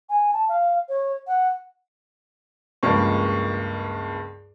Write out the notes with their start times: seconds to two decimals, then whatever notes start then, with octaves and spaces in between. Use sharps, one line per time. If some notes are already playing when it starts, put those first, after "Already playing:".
0.09 G#5
0.33 A5
0.49 F5
0.89 C#5
1.27 F#5
2.83 C#2 G2 F3 G#3 A#3 C#6